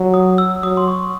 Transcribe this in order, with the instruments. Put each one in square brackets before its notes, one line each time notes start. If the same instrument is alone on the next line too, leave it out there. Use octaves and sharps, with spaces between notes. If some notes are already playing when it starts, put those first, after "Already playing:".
Already playing: [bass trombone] F#3
[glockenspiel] D#6
E6
[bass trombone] F#3 [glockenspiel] D#6
[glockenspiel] C6
C#6